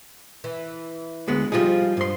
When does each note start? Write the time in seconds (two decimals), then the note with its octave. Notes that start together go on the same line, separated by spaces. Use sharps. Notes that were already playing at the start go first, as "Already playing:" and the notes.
0.44 E3
1.27 D2 G#3 B3
1.52 F3 G3 D#4 F4 G#4
1.97 G2 C6